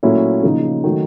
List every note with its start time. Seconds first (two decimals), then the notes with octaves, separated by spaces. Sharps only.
0.03 A#2 F#3 A3 C#4 E4
0.43 C#3 F3 A#3 D#4
0.84 D#3 F#3 A3